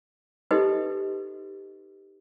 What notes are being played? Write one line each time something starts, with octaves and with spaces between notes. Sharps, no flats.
D#4 G4 A4 B4 D#5 C6